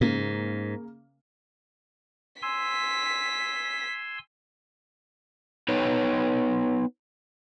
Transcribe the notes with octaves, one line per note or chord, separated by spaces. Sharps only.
G#2 C#3 A#3
G#5 C6 E6 B6
B3 D#4 B4 C#5